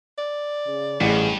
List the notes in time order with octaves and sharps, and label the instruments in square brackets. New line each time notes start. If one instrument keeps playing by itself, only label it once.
[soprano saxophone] D5
[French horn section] C#3
[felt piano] A1 [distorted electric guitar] G2 [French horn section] G#4